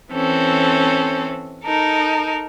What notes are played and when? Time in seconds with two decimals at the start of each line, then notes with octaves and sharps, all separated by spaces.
0.11 E3 C4 C#4 A4
1.65 D#4 A4 A#4